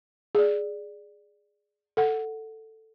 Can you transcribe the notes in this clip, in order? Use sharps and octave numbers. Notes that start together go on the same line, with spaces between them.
G#4 D5
A4 F#5